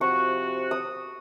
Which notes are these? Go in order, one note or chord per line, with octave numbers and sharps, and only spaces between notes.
C3 F3 F#4 C#6
D#6